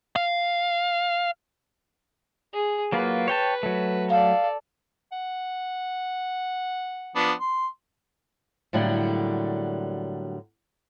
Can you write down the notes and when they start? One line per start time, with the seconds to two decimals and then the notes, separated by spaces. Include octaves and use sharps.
0.16 F5
2.53 G#4
2.92 F#3 A#3 F4 B4
3.28 C#5 G5 A5
3.63 F#3 A3
4.10 A4 D5 F5
5.12 F#5
7.16 F3 B3 D4
7.41 C6
8.73 A2 D3 F#3 G3 A#3